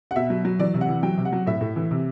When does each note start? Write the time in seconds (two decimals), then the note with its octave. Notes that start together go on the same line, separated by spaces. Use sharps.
0.11 F#5
0.16 B2 E5
0.30 F#3
0.45 F#3
0.59 E3 D5
0.74 C3
0.81 F#5
0.89 E3
1.03 F#3 G5
1.18 C3
1.25 F#5
1.33 F#3
1.47 A2 E5
1.61 A2
1.76 E3
1.91 C3